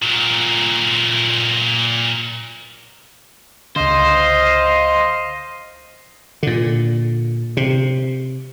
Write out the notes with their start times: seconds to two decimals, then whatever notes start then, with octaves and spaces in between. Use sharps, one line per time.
0.02 A#2 F#3
3.76 C#2 D3 C5 D#5 F5
6.43 A#2 D3
7.57 C3